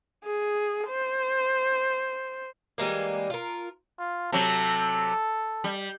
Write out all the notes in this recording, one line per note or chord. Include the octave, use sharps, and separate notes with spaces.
G#4
C5
E3 G3 G#3 A#3
F4 A#4
F4
C3 F#3 A4
G3